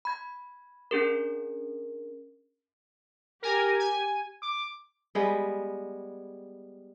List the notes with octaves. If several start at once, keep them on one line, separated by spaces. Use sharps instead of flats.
B5 G#6
C#4 D4 G#4 A#4
G4 A#4 G#5
G#5
D6
G3 G#3 B3